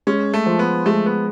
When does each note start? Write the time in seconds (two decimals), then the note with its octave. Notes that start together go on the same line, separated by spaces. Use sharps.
0.07 G#3 C#4
0.33 A3
0.46 F3
0.59 B3
0.86 G#3 A3
1.06 B3